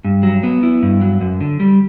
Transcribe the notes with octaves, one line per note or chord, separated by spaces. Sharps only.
G2
F#3
B3
E4
G2
F#3
F#2
D3
G3